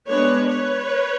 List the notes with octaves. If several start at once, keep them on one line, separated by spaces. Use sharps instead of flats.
G#3 B3 D4 B4 C#5
B4 C#5